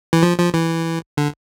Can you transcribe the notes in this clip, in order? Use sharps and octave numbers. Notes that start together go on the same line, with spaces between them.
E3
F3
F3
E3
D3